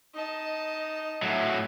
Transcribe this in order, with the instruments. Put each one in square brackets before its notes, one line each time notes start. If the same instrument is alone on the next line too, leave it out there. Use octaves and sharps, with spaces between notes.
[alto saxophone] D#4 [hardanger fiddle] D#5 A5
[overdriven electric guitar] A2 F#3 [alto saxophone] E5